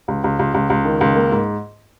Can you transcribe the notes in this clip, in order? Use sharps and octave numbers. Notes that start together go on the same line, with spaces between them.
C#2
C#2
C#2
C#2
C#2
D#3
C#2
A#3
G#2